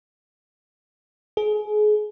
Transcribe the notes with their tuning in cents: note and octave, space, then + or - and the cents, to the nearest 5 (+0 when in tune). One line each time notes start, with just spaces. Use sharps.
G#4 +30